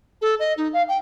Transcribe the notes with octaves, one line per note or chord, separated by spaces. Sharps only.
A4
D#5
D#4
F5
G5